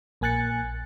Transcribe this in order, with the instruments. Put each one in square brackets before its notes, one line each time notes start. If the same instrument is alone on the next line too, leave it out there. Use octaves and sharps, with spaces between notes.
[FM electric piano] A#1 A#3 G#5 F#6 A6 C#7